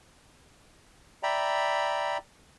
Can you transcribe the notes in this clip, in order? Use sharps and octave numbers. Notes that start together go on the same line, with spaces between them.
D5 E5 G5 A#5 B5